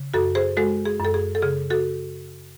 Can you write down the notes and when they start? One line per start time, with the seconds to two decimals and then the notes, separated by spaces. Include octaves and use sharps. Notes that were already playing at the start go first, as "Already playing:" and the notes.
Already playing: C#3
0.14 F#2 F#4 A4
0.35 G#4 C5
0.57 G#3 F#4 A4
0.85 G#4
1.00 F#2 A4
1.14 G#4
1.35 A4
1.42 C#3 G#4
1.70 F#4 A4